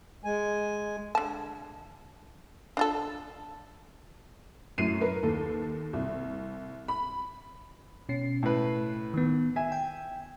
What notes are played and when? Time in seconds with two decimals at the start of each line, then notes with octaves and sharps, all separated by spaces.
0.24 G#3 G#5
1.15 D3 A5
2.77 D4 F4 A4
4.78 F#2 A2 C7 D#7
5.01 A#4 B4
5.23 D#2 A4
5.93 C2
6.88 B5
8.09 B2 C#4 C7
8.43 A2 B4
9.14 D#3 B3
9.56 E5 G#5
9.72 G5